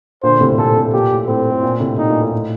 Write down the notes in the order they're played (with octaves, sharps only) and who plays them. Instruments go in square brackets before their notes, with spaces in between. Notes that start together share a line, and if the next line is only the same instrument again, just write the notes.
[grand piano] A#2 D3 [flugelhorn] C5
[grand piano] A2 C3
C3
[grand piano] A#2 [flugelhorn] A4
[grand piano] A2 C3
[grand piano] A#2 [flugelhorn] G4
[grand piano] A2
[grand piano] A2 [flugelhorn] C4
[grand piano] A2
A#2
A2 C3
[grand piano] A#2 [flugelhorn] D#4
[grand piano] A#2
A2
A2